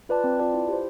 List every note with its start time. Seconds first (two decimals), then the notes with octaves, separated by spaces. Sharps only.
0.09 F4 B4 D5 A5
0.24 C4
0.39 F4 B4 D5 A5
0.54 E4
0.69 G4 C5